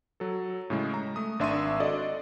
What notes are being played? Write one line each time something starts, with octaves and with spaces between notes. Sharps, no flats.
F#3 A4
A2 C#3 G#3
A#5
A3 D#6
G#1 D4 E5 C6 C#6 D#7
D4 F#4 A4 D5 D#5